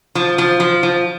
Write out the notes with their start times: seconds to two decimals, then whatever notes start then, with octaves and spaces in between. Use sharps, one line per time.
0.15 F3
0.38 F3
0.60 F3
0.83 F3